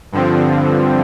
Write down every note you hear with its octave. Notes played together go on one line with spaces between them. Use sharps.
G2 D3 F3 C4